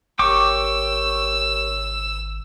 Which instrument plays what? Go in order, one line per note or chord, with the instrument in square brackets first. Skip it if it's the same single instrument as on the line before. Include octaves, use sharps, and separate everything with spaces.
[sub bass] G#1 [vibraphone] G4 A#4 C#5 [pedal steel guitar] G5 C#6 D6 [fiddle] E6